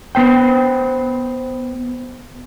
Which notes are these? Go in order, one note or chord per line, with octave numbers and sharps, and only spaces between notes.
B3 C5 G5